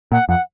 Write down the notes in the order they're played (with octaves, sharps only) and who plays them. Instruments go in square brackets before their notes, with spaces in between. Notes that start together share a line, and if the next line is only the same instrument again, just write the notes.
[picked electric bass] A#2 [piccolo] F#5
[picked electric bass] F2 [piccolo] F#5